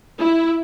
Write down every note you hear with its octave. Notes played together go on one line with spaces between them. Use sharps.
E4